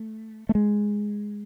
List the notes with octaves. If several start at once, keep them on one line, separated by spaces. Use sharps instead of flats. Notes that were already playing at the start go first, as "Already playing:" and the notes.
Already playing: A3
A3
G#3